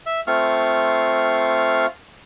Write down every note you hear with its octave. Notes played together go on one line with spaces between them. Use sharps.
E5
A3 C4 F4 F5 C#6 F6